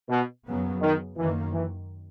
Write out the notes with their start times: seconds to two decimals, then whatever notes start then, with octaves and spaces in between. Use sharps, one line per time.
0.10 B2
0.46 F#2 C#3 F#3 B3
0.82 D#3
1.17 F#2 D#3 E3 A#3
1.54 E3